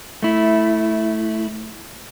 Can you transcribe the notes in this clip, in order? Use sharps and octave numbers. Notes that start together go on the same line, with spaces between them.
A3 E4